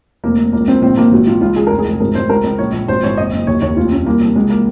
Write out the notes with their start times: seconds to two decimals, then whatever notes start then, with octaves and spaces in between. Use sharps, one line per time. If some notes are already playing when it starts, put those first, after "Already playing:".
0.24 F1 A#3
0.38 F1
0.53 C#2 A#3
0.68 C#2 C4
0.82 A#1 C4
0.97 A#1 A#3
1.12 G#1 F#4
1.27 G#1 F4
1.41 C#2 F4
1.56 C#2 G#4
1.67 F1 A#4
1.79 G#4
1.85 F1
2.00 G#1 A#4
2.15 G#1 C5
2.29 C#2 A#4
2.44 C#2
2.59 A#1 C#5
2.73 A#1
2.88 G#1 C5
3.03 G#1 C#5
3.17 F#1 D#5
3.32 F#1
3.47 D#2 C#5
3.62 D#2 C#5
3.77 F1 F4
3.92 F1 C#4
4.06 C2 A#3
4.21 C2
4.36 C#2 G#3
4.50 A#3